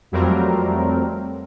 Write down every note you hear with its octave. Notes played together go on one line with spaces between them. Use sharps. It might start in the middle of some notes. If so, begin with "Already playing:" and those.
F2 F#3 G3 A3 C4 A#4